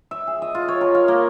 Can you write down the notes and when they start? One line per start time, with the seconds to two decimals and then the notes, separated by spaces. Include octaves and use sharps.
0.11 E5
0.27 G#4
0.42 D#5
0.55 F4
0.68 C#5
0.81 A#4
0.95 F5
1.08 A#3